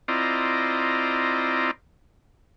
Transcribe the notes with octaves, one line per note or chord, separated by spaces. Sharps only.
C4 E4 F4 D5 D#5 A#5